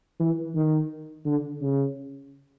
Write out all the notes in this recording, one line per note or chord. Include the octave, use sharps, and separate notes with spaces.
E3
D#3
D3
C#3